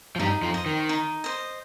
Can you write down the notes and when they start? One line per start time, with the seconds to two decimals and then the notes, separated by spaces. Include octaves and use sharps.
0.16 F3
0.19 G2 G3 D#4
0.42 F2 F3
0.54 C5 D#5
0.66 D#3
0.89 D#4
1.24 C5 D#5